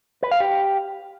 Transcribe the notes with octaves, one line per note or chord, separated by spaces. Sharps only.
B4
F5
G4